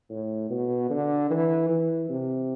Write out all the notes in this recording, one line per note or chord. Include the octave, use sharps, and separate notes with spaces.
A2
B2
D3
E3
E3
C3